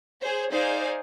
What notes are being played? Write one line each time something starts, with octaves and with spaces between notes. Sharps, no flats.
G#4 C5 C#5
D#4 G#4 C5 D5 F5